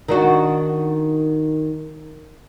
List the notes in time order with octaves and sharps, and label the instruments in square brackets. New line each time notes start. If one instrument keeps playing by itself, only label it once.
[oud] D#3 D4 F#4